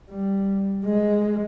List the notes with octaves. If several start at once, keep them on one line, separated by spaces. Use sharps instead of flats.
G3
G#3